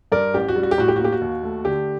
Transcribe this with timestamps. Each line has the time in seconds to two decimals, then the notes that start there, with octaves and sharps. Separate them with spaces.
0.12 G2 A#4 D5
0.34 A1 G4
0.48 F#4
0.56 G3
0.63 F#4
0.71 G4
0.78 A2 F#4
0.88 G4
0.96 F#4
1.00 A#3 G4
1.12 F#4
1.21 D#2
1.43 A3
1.65 D3 G4